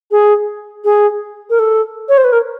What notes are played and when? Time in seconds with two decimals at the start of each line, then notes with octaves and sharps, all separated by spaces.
0.11 G#4
0.85 G#4
1.50 A#4
1.59 A4
2.09 C#5
2.18 C5
2.24 B4
2.32 A#4